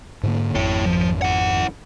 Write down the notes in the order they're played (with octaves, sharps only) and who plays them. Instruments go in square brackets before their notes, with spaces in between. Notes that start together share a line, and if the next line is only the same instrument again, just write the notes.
[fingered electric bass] G#2 D3 A#3
[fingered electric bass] G#1 F2 [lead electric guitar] E4 C#5
[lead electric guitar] F3
E4 F#5